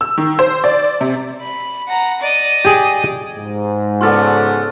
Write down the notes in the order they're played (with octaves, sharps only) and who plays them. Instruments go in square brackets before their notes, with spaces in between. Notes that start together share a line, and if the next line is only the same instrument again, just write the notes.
[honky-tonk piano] E6
D#3
C5
D5
C3
[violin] B5
F#5 A#5
D5 D#5
[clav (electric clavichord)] G4 G#4
[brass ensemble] G#2
[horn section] C#3 B3 [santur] F#4 A4 D5 [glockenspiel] C6 F6 A6